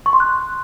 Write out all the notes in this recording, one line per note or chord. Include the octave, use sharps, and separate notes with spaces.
C#6
C6
F#6